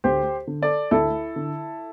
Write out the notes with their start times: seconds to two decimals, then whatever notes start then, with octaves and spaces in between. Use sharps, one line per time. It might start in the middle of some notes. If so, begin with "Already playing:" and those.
0.04 D2 G4 C5
0.47 D3
0.62 A4 D5
0.91 D2 E4 A4
1.36 D3